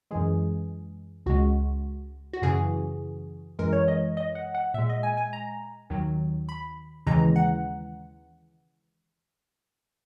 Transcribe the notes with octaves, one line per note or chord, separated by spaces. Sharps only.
F#2 E3 G#3 G#4
C#2 C#3 G#3 F#4
F#4
F#2 C#3 E3 G#4
F#2 E3 G#3 A#4
C#5
D#5
D#5
F#5
F#5
A#2 G#3 E5
D#5
G#5
G#5
A#5
D#2 D#3 F#3
B5
D#2 C#3 E3 G#3 A#5
F#5